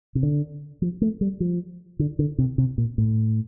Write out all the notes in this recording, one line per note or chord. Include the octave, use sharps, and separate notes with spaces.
C3
D3
F3
A3
G3
F3
D3
D3
C3
C3
A#2
A2